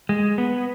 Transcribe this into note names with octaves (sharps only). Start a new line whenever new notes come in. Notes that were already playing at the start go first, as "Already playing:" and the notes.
G#3
B3